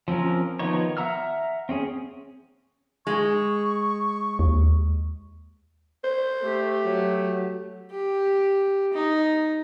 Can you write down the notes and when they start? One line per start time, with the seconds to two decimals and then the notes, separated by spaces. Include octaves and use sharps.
0.08 F3 C4 C#4 A#4
0.59 D#3 F3 B3 D#4 C#5
0.97 E5 F#5 A#5 E6 F6
1.69 C4 C#4 G#4
3.07 G#3 C#6
4.39 D#2
6.04 C5
6.41 A3 G4
6.85 F#3
7.90 G4
8.93 D#4